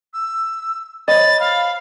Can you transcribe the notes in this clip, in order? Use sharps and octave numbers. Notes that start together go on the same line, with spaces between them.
E6
C5 C#5 D#5 B5 A6
F5 B5